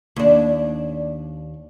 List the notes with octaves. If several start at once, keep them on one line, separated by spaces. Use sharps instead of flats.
D#2 D4